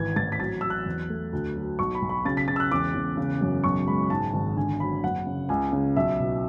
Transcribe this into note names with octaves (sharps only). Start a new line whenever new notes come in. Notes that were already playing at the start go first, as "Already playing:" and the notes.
Already playing: G#1 E3 G#6
A1 A6
B6
F#3 A6
F#3 E6
F#6
E2
A3
D2
F#3
B1 C#6
B5
B1
B5
C#3 A6
B6
C#3 A6
E6
F#6
E1 D6
E1
C#3
F#2
B1 C#6
G#3 B5
G#2 A5
G#1
D3 G#5
F#3 B5
F#1 F#5
C#3
C#2 G#5
C#3
B1 E5
B2